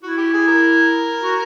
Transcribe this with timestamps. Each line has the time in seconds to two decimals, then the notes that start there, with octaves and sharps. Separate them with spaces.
0.03 E4 F#4
0.18 G4
0.33 G#4
0.47 A#4
1.23 F#4